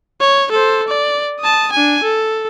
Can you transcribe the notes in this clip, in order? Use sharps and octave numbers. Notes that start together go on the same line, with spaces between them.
C#5
A4 C5
D5
A5 D#6
D4 G#5
A4